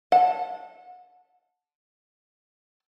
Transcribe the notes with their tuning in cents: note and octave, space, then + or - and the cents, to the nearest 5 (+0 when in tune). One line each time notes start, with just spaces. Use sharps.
F#5 -30 A5 +0